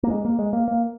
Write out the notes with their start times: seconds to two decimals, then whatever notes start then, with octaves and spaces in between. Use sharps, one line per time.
0.03 A#3
0.10 G#3
0.25 A#3
0.39 G#3
0.53 A#3
0.68 A#3